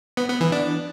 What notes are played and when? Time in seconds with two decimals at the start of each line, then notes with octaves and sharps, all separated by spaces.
0.17 B3
0.29 B3
0.41 E3
0.52 D4